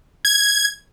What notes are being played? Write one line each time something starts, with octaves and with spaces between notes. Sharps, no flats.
G#6